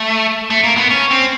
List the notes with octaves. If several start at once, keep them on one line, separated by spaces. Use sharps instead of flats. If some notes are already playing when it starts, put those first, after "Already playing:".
Already playing: A3
A3
A#3
B3
C#4
C4